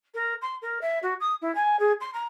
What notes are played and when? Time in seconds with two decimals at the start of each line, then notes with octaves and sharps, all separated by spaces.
0.14 A#4
0.42 C6
0.62 A#4
0.82 E5
1.03 F#4
1.20 D#6
1.42 E4
1.55 G#5
1.79 G#4
2.01 C6
2.14 A#5